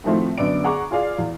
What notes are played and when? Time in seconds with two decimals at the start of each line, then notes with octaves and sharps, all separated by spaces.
0.04 A2 D#3 F3 A3 C4
0.38 F#2 D3 B3 D5 D7
0.64 G#4 F#5 A#5 C#6 D6
0.91 F4 G#4 D5 F5
1.18 E2